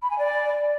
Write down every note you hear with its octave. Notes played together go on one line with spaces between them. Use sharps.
B5
G#5
D5